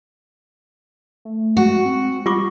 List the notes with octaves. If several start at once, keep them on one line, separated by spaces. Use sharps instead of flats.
A3
G#3 F#4 F#5
C4
G3 F4 C#6 D6 A#6